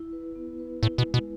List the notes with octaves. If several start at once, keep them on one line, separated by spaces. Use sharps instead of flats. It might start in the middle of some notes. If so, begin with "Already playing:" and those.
Already playing: E4
B4
B3
B4
A2 E4
B2
G#3
B2